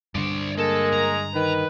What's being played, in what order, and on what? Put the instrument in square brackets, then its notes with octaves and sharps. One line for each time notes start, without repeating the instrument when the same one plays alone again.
[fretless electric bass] G2 D3 [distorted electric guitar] C5 D5
[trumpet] G#3 [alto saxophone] A#3 [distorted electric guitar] A4
[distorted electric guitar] A#5
[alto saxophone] D#3 [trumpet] B4